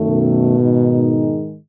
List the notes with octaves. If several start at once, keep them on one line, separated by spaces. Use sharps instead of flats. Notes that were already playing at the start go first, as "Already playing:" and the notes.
Already playing: F#2 D#3 A3
B2
G#2 D#3 G#3 D#4